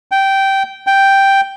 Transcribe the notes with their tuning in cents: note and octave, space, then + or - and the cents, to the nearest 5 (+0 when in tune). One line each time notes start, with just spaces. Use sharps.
G5 -10
G5 +0